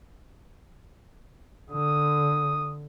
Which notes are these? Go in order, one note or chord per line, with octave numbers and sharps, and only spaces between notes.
D3 D#6